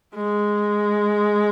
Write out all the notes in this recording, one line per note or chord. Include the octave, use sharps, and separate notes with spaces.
G#3